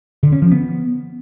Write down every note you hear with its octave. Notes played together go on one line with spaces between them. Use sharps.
D3
C#4
F3
B3